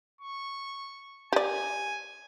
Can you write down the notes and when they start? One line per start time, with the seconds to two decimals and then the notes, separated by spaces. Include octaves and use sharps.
0.21 C#6
1.33 G4 D5 G#5